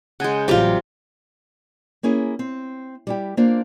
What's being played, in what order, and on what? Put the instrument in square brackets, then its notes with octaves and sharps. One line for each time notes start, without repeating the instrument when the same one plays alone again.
[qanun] C#3 G#3 [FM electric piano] F#5 G#5 G6
[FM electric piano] A1 F#3 [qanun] C3 G4 A#5 [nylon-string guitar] G3 F4
[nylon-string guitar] A#3 C#4 E4 G#4
C4
G3 E4 G4
A#3 D4 F4 C5 F5